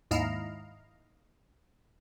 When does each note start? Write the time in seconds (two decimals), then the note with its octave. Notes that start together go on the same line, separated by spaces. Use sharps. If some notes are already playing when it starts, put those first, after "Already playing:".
0.11 D#2 G#2 E4 D#5 F5 A#5